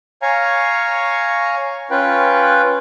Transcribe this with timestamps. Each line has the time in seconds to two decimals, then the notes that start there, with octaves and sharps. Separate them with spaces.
0.22 C#5 F5 G#5 A#5 C#6
1.91 C#4 F4 B4 G5